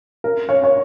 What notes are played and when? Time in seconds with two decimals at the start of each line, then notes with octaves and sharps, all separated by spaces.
0.24 A#4
0.49 C#5
0.64 C#5